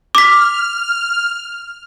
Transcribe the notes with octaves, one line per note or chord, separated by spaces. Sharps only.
D6 F6 B6